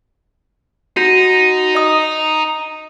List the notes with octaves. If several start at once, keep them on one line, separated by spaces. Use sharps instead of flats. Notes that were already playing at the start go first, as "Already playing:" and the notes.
D#4 F#4 A#6
D#5 D#6